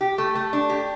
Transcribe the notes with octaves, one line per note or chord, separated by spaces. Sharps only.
G4
A3
A3
D4
G4